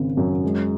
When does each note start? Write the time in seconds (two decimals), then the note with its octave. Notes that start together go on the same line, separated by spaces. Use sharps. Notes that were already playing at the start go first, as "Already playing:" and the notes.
Already playing: G#1 C#3
0.17 F#2
0.44 G#3